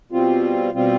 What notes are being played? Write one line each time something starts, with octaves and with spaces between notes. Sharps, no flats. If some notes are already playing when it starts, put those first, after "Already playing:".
B2 G3 C4 F4
B2 G3 C4 F4